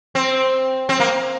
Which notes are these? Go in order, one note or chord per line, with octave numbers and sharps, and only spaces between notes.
C4
C4
A#3